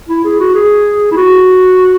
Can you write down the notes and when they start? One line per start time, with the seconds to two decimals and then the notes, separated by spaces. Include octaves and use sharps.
0.09 E4
0.24 G#4
0.40 F#4
0.54 G#4
1.11 E4
1.17 F#4